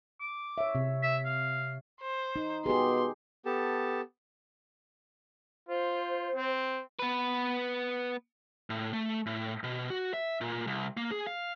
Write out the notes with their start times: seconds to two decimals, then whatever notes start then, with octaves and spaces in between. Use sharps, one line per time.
0.20 D6
0.58 C#5 E5
0.75 C3
1.03 E5
1.25 F5
2.01 C5
2.36 D#4
2.66 B2 G4 G#4 C6
3.46 B3 G4 A4 A5
5.69 F4 C5
6.35 C4
6.99 B3 B4
8.70 A2
8.93 A3
9.26 A2
9.64 B2
9.90 F#4
10.13 E5
10.41 A#2
10.67 C2
10.97 A#3
11.11 G#4
11.27 F5